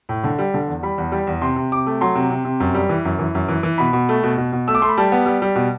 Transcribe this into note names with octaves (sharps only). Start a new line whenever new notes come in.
A2
D3
G3
D3
E2
G3 B5
E2
G3
E2
C3 C6
C3
C3 D6
A3
F#3 C6
C3
C3
C3
F#2
G3
E3
F#2
E3
F#2
E3
E3
B2 B5
B2
A3
B2
B2
B2
A3 E6
D6
A3 C6
B5
G3 A5
B3
G3
G3
B2